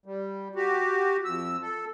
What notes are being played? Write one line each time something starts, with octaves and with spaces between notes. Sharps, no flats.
G3
F#4 G4
F2 E6
A4